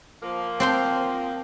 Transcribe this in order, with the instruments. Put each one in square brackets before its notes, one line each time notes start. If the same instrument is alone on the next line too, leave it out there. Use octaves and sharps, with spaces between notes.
[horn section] F3 A#3
[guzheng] C4 C5 C6